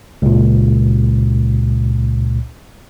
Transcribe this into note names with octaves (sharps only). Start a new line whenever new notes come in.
C#2 A#2